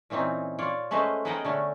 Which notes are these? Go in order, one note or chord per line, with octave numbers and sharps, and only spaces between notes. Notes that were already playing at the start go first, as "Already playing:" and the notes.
A#2 E3 C4 C#4 D#4
F4 C#5 D5
G#3 A3 C#4 B4 C5 D#5
B3 G#4 A#4 D#5 F#5 G5
D3 A3 C#4